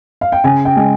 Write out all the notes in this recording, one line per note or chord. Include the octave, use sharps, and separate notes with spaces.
F5
G5
C#3 G#5
G5
G#3